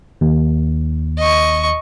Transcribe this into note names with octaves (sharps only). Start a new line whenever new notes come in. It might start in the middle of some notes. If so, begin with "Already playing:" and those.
D#2
D#5 C#6